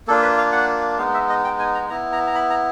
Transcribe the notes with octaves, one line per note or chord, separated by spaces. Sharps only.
A#3 D4 F4 A4
B4
F5
F#5
G#3 B3 D#4 F5
E5
D#5
G5
G#5
A#5
B3 E4 A#5
A#5
A#5
B5
A#5